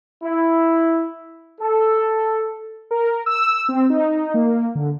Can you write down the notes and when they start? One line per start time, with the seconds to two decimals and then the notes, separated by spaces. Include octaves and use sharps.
0.23 E4
1.61 A4
2.91 A#4
3.26 E6
3.69 C4
3.90 D#4
4.34 A#3
4.75 D3